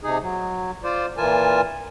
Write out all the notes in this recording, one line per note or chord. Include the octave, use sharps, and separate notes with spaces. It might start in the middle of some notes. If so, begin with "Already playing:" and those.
C3 D#4 G#4
F#3
F4 C5 D5
A#2 E3 F4 A#4 G#5 A5